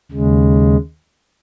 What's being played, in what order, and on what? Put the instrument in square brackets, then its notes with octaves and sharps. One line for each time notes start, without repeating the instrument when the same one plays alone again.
[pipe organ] D#2 C#3 G#3